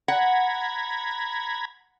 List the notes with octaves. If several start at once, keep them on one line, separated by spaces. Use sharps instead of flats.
F#5 A#5 B5 G#6